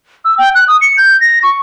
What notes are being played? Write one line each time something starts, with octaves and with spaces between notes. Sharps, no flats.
E6
G5
F#6
D#6
C#7
G6
A#6
C#6